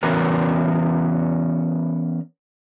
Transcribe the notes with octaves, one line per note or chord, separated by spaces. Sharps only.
E3 B3 C#4 F#4 A#4 B4